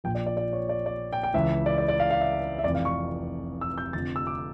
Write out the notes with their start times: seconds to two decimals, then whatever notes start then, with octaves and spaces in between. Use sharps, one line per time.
0.04 A#1 A#2 F3 G5
0.15 D5
0.26 D5
0.37 D5
0.53 C#5
0.69 D5
0.86 D5
1.13 G5
1.23 G5
1.34 C#2 C#3 E3 E5
1.66 D5
1.78 D5
1.88 D5
2.00 F5
2.11 F5
2.21 E5
2.59 E5
2.64 F1 F2 E3 D5
2.75 F5
2.85 C#6
3.61 E6
3.78 G6
3.93 F1 F2 D3 F3 A6
4.16 E6
4.27 D6